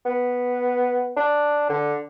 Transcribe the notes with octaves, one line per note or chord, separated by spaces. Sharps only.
B3
D4
D3